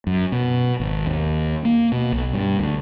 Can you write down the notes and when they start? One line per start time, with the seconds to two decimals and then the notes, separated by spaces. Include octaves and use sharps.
0.07 F#2
0.32 B2
0.80 G#1
1.06 D#2
1.65 A#3
1.92 B2
2.13 B1
2.33 G2
2.59 D2